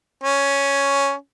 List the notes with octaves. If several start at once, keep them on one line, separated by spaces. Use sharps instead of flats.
C#4